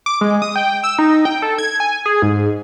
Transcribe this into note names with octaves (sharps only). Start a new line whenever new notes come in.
D6
G#3
D#6
G5
E6
D#4
G5
A4
G#6
G#5
G#4
G#2